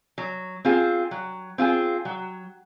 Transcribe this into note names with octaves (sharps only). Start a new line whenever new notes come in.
F#3
C4 F4 G#4
F#3
C4 F4 G#4
F#3